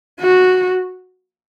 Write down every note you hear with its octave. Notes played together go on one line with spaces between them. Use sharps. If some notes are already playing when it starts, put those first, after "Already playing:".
F#4